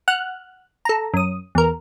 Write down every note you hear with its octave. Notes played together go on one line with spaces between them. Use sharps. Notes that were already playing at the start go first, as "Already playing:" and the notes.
F#5 F6 F#6
A4 A#5
F#2 D#6
E2 A#4